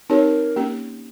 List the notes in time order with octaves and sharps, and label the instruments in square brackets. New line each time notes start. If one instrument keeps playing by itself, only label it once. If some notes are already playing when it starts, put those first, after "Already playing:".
[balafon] C4 D#4 G4 C#5 [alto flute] A#4
[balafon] A#3 C#4 G4